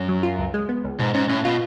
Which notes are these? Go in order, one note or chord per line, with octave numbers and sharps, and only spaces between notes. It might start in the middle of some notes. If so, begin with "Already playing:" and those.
Already playing: F#2
F#3
F4
C#2
G#3
B3
C#2
G#2 B2
G#2 C#4
A2 C#4
B2 F4